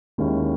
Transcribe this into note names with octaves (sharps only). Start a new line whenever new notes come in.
D#2 D#3 G#3 C#4 E4